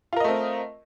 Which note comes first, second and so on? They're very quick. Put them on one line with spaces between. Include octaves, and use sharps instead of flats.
F4 A#4 D#5 A3 C4